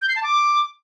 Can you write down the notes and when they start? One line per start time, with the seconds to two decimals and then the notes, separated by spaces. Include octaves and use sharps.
0.02 G6
0.09 C7
0.16 A5
0.23 D6